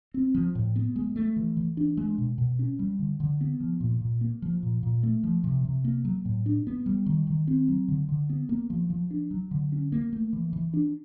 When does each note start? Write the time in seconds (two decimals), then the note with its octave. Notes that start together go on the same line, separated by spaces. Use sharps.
0.14 C4
0.34 F3
0.55 A2
0.76 B3
0.96 G#3
1.16 A3
1.36 E3
1.57 E3
1.77 D4
1.97 G#3
2.18 B2
2.38 B2
2.59 C#4
2.79 G3
2.99 D3
3.20 D3
3.41 B3
3.60 F3
3.81 A#2
4.01 A#2
4.21 A#3
4.42 F3
4.63 A#2
4.83 A#2
5.03 A3
5.24 F3
5.44 C3
5.65 C3
5.85 A#3
6.05 F#3
6.25 A2
6.46 D4
6.67 B3
6.86 G3
7.06 D#3
7.27 D#3
7.48 C4
7.68 F#3
7.88 D3
8.09 D3
8.30 B3
8.49 A#3
8.70 F3
8.90 F3
9.11 D4
9.31 F#3
9.51 D3
9.72 C#4
9.92 A#3
10.13 A3
10.33 E3
10.53 E3
10.74 D4